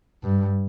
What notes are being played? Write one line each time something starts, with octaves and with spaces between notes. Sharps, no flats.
G2